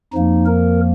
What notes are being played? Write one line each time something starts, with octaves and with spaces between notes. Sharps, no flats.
F2 F3 A#3 D#4
A#4